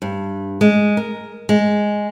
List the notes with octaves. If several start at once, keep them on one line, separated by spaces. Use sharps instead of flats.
G2
G#3
A#4
G#3